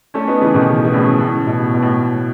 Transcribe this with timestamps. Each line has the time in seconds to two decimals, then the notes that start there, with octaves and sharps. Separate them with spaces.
0.14 A3 C#4
0.28 B3 D#4
0.41 C#3 E3
0.54 B2 D#3
0.84 B2
0.94 A2 C#3
1.20 A2
1.47 B2
1.74 B2
1.82 A2
2.00 A2